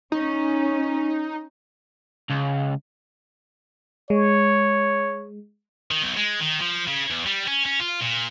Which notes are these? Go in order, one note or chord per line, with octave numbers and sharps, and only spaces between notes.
C#4 D#4
C#2
G#3 C#5
D#3
B1
G#3
D#3
F3
C#3
E2
G3
C#4
C#4
F4
A#2